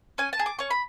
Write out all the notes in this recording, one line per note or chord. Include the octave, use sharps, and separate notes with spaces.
C#4 G#5
A5
G#4
D6
C#4 C#6
B5